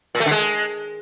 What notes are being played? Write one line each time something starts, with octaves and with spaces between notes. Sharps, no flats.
A#2
A3
D3
G#3